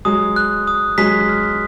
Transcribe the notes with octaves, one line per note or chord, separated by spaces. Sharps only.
F#3 G#3 D#6
F#6
D#6
F#3 G#3 B6
F6